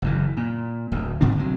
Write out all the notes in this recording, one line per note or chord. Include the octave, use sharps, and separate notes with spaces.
F#1 F#2 E3
A#2
D1 D2
G2 D3 C4 D4
B1 C3 F#3